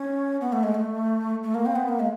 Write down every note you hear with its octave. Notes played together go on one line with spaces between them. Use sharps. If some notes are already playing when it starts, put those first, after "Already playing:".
Already playing: C#4
B3
A3
G#3
A3
A3
A#3
C4
B3
A#3
G#3